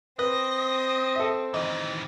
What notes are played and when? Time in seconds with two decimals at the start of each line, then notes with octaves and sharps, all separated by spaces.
0.19 C4 B4 D#5
1.16 A4 E5
1.54 D#3 E3 D#4